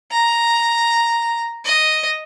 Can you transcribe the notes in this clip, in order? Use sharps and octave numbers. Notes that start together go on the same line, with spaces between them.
A#5
D#5